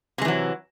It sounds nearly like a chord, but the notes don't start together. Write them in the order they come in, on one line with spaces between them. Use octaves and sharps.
C3 G#3 E3 F#3